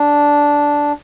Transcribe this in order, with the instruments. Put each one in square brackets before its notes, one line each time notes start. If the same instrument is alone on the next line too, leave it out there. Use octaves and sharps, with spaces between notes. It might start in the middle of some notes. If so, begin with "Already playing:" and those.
Already playing: [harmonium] D4